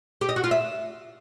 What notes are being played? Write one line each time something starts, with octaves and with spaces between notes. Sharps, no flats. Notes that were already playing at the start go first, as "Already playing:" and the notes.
G4
D#5
F#4
F4
E5